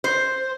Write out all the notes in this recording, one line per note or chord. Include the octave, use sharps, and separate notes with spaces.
C5